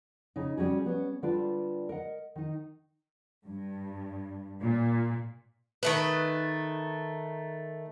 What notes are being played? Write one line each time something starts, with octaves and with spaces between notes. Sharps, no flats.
C#3 D#4
G3 C#4 F#4 G#4
G3 B3 C#4
D3 G3 D4 F4 B4 D5
A#4 D#5 F#5
D#3 D#4
G2
A#2
D#3 A3 B4